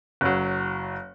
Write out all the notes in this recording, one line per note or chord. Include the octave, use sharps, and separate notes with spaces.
F#1 F#3